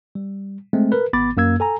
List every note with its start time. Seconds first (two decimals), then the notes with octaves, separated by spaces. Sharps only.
0.15 G3
0.73 G#3 A3 C4
0.92 A#4 B4
1.13 G#1 B3 B5 D6 A6
1.37 F#2 A#3 E6 G#6
1.60 A4 G#5 A#5